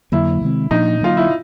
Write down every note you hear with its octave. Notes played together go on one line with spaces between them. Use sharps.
F2 D3 F#3 A#3 E4
C3 D#3 G#3 C4
A#2 F3 A#3 D4 D#4
D3 F#3 A#3 F4
E4